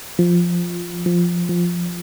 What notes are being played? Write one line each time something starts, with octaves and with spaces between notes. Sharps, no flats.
F3
F3
F3